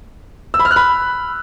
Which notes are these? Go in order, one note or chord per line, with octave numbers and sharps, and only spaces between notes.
E6
B5
F6
F#6
B5